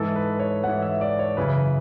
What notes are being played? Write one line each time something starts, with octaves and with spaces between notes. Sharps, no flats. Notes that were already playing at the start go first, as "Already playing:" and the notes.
Already playing: G#2 E3 A4
B4
C#5
G#2 E3 F#5
E5
D5
C#5
F#2 C#3 E3 B4